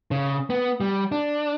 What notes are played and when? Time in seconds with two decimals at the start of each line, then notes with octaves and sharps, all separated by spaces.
0.11 C#3
0.50 B3
0.80 G3
1.12 D4